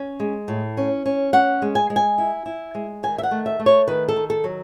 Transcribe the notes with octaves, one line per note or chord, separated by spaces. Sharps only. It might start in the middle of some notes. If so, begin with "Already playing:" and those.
Already playing: C#4
G#3
A2
C#4
C#4
C#4 F#5
G#3
G#5
G#3
G#5
E4
E4
G#3
D#3 G#5
E5
F#5
A3
E5
A3
C#5
D#3 B4
A4
D#3
A4
F#3